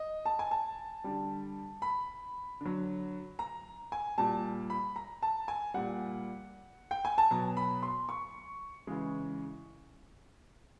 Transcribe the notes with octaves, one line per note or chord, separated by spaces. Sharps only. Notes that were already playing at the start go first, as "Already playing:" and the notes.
Already playing: D#5
A5
G#5
A5
D3 G3
B5
D3 F#3
A#5
G#5
A#2 G3 A5
B5
A#5
A5
G#5
A#2 G3 F#5
G5
G#5
A5
B2 F#3 A#5
B5
C6
C#6
C#3 E3 G#3